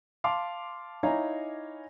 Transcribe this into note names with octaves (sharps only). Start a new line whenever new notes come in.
F5 A5 C6 D6
D#4 E4 C#5 F5 G#5 A#5